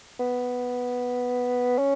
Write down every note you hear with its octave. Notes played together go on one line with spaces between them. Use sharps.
B3
C#4